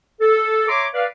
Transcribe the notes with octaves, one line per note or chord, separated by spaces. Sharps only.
A4
C#5 E5 A#5 C6 D6
B4 D5 F5